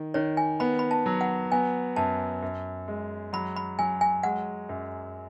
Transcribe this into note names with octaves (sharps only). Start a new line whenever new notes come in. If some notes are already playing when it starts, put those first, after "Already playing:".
Already playing: D#3
D#3 C#5
G#5
B3 B5
B5
A5
F#3
F#5
B3 G#5
F#2 A5
F#2
G#3
F#3 B5
B5
F#3 G#5
G#5
G#3 F#5
F#2